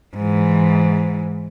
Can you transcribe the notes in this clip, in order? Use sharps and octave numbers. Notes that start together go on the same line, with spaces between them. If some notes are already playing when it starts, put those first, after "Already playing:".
G#2 E3